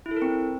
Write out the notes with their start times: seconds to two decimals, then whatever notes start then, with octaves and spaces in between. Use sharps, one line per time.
0.06 E4
0.11 A4
0.16 A#4
0.22 C4